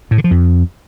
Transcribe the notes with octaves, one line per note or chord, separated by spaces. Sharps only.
A2
D3
F3
F2